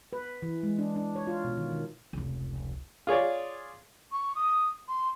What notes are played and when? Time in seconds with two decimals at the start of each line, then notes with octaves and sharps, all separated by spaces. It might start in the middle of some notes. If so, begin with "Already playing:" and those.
0.13 B4
0.42 E3
0.63 G#3
0.79 D4
0.96 D4
1.16 C#5
1.27 F4
1.44 B2
1.57 D#3
1.72 D#3
2.13 F1 C#2
3.07 F4 G#4 C#5 D5
4.12 C#6
4.35 D#6
4.88 C6